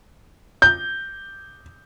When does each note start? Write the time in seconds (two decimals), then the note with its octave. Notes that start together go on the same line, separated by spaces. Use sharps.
0.62 G6